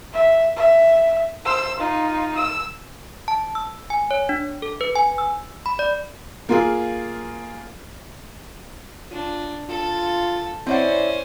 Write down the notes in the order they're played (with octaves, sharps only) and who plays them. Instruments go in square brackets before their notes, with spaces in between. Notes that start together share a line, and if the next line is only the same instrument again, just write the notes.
[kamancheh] E5
E5
C5 E6
D#4 F4
E6
[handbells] A5
E6
G#5
C#5
D4
A4
B4
G#5
E6
B5
D5
[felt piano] A#3 F4 G#4
[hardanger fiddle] D4 [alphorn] F4
[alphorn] F4 [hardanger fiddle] A4
[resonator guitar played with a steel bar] C4 D5 F#5 [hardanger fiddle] C#4 C5 [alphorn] E4